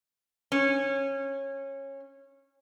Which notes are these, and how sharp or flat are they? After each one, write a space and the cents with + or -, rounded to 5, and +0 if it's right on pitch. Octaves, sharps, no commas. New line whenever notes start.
C#4 -20